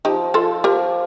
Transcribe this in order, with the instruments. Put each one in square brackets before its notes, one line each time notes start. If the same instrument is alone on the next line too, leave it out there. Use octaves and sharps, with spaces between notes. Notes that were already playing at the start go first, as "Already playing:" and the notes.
[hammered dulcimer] F3 [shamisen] D#4 G4
[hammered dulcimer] F3 [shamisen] F4 A4
[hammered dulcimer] F3 [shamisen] G4 A#4